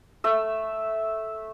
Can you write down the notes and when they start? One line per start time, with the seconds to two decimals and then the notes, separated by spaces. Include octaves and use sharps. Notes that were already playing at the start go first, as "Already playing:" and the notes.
0.24 A3 E5